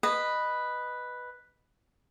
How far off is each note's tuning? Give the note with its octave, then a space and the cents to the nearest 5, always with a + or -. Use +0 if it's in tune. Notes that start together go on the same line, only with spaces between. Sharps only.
B4 +0 D#5 -10